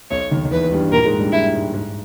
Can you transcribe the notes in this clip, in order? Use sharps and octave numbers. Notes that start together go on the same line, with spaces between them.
B1 B2 C#5
D#2 D#3
D#3
E2 E3 B4
G2 G3
A#2 A#3 A#4
G#2 G#3
G2 G3
G#2 E4
G#2
G#2